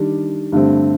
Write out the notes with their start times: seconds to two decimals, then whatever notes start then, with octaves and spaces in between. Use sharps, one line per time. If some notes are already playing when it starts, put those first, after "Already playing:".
Already playing: D#3 G3 D4
0.52 G2 D3 A3 C4